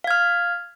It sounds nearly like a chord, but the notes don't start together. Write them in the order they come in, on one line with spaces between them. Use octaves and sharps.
F5 G#6 F6